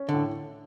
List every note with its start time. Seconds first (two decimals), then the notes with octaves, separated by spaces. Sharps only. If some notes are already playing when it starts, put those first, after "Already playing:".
Already playing: C#4
0.09 D3
0.14 A2